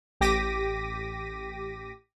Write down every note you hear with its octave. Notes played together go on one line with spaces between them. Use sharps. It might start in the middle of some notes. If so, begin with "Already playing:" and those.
A1 G4 D6 A#6 B6 D#7